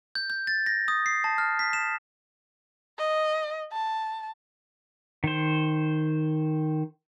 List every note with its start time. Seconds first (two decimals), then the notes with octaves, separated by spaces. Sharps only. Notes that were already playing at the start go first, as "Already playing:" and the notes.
0.15 G6
0.30 G6
0.47 A6
0.66 A#6
0.88 D#6
1.06 C7
1.24 A5
1.38 F6
1.59 B6
1.73 E7
2.98 D#5
3.72 A5
5.24 D#3 C5